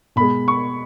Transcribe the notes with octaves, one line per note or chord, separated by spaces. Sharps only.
B2 G#3 B5
C#6